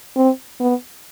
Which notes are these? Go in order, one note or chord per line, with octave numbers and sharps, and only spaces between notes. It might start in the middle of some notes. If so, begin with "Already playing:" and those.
C4
B3